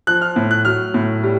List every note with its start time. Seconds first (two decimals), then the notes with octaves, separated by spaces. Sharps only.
0.07 F3 F#6
0.21 F6
0.36 A2
0.51 F#6
0.65 F#3 F6
0.94 A2
1.23 G3